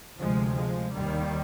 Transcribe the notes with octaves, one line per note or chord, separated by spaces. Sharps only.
D2 C3 F3 G#3
F3 G#3
D#2 D#3 G3